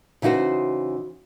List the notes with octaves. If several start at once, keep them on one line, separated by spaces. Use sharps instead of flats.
C#3 E3 D#4 F#4 C5